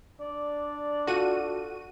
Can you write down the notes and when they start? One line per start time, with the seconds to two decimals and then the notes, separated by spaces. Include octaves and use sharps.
0.21 D4 D5
1.07 F4 F#4 A4 D#7